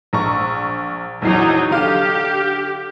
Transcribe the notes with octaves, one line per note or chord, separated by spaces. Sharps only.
A#1 A#5 C#6
A#1 E2 F#3 D#4 C7
D3 G4 F5 F6